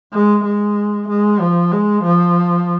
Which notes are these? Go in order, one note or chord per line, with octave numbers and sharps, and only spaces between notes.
G#3
G#3
G#3
F3
G#3
F3